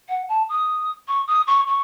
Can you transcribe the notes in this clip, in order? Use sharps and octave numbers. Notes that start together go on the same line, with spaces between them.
F#5
A5
D#6
C#6
D#6
C#6
C#6